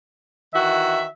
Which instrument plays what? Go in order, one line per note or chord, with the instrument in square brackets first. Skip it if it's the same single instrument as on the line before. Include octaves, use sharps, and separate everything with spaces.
[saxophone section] D#3 E3 F#4 [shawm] E5